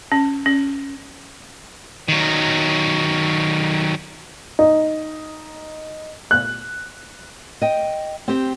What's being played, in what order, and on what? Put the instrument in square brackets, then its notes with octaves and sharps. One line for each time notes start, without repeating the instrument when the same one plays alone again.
[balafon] C#4
C#4
[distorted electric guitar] D#3 F#3
[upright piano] D#4
F#6
[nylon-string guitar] D#5 G5
C4 G4